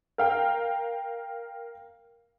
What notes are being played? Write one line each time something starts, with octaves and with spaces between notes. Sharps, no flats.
A#4 F5 G5